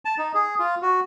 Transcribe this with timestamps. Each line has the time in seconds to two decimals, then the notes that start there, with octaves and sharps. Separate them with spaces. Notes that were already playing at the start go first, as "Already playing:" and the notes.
0.05 A5
0.18 D#4
0.35 G#4
0.59 F4
0.82 F#4